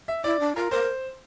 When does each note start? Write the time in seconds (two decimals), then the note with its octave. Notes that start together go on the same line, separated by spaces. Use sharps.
0.08 E5
0.24 E4 D5
0.40 D4
0.56 F4 A#4
0.71 A#4 C5